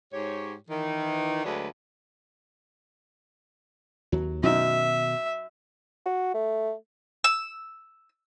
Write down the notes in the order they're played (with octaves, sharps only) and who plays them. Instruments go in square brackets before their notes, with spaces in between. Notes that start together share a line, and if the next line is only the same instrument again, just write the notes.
[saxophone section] G#2 G4 C#5
D#3 E3
D2 F#3 G#3 D4 B4
[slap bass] D#2 [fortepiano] F#3
[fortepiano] F#2 D#4 [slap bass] B2 D#3 F#3 [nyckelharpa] E5
[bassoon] F#4
A3
[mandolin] E6